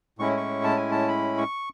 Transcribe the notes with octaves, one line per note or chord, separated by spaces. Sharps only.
A2 G#3 C#4 E4 C#6
C#6
A5
G#5
A5
B5
C#6